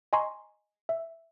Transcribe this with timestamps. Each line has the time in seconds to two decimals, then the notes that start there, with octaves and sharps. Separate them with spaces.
0.13 D#5 G#5 A#5 C6 C#6
0.89 E5